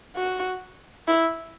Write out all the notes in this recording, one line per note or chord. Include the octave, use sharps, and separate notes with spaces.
F#4
E4